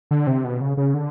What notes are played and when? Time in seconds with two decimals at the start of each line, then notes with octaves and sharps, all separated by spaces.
0.11 D3
0.27 C3
0.44 B2
0.61 C#3
0.77 C#3
0.94 D3